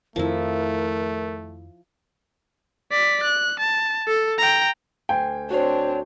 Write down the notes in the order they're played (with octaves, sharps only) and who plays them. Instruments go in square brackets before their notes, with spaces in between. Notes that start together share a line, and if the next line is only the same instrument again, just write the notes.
[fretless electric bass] F2 D#3 [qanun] F3 E4 [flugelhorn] A3 [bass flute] A#4
[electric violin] D5 B6
F#6
A5
A4
G5 A#5
[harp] D2 G#5 C6 [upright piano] G5
[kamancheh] C4 D4 [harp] F#4 C5 [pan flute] C#5